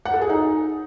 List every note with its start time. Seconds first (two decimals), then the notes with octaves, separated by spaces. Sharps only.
0.05 F#5
0.13 A4
0.21 G#4
0.30 D#4